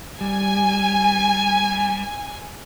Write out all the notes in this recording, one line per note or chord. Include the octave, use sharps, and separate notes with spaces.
G3 G#5